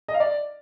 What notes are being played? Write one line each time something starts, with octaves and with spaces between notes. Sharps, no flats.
D#5
F5
D5